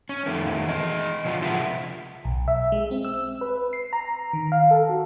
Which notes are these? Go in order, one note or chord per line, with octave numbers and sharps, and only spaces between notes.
C#4
F2 D#3 A3 B3
E3 G#3 D#5
C#3 F3 B3 D4 E4 F4
C3 F3 G#3 A#4 E5 F#5
B1
E5
G#3
C4
E6
B4
C7
A#5
D#3
F5
A4
F#4